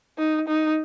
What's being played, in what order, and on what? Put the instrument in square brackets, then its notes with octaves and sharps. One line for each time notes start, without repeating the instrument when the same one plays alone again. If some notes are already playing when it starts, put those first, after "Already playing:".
[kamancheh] D#4
D#4